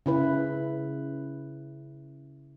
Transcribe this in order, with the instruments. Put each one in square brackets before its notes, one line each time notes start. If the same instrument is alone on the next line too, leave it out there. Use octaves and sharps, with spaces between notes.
[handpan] C#3 E4 B4